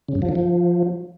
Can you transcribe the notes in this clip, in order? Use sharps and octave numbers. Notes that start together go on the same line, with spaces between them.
C#3
G2
F3
D#3
F3